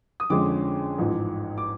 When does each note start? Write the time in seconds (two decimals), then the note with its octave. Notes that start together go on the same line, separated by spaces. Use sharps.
0.20 D#6
0.30 F2 D3 F3 G#3 C#4 D6
0.98 A1 G#2 F3
1.58 D6